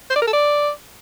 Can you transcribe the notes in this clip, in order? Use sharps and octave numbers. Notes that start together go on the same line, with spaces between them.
C5
D5
A#4
A4
D5